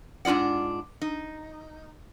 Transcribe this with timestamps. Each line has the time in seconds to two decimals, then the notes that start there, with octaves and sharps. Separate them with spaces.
0.25 G#2 D4 F4 D5 F#5
1.02 D#4